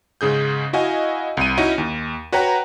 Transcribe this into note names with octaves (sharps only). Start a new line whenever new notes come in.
G#2 C#3 G#4 G6
E4 F#4 D#5 F5 G#5
C2 D#7
C#4 D#4 E4 F#4
D#2
F#4 B4 C#5 F#5 G5 A#5